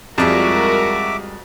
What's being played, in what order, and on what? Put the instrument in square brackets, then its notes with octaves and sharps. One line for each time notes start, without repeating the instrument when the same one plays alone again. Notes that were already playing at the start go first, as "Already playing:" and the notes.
[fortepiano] F2 [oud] G3 G#3 F4 [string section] F#4 A#4 [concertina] E5 D6